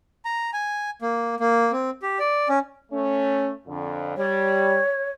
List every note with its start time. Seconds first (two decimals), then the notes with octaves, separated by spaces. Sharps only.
0.25 A#5
0.53 G#5
1.02 A#3
1.40 A#3
1.72 C4
2.02 G4
2.19 D5
2.49 C#4
2.92 A3 C#4
3.67 F2 D3
4.17 G3 C#5